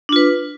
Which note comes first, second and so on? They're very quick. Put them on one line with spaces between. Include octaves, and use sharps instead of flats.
D4 F4 B4